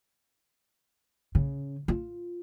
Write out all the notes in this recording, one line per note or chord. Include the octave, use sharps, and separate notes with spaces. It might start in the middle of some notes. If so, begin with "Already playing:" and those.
C#3
F4